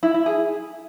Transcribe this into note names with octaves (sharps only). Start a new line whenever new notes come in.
E4
E4
G#4